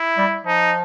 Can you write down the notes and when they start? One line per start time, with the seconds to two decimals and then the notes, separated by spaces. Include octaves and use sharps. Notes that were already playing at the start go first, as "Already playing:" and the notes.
Already playing: E4
0.17 G3
0.46 F3 D#4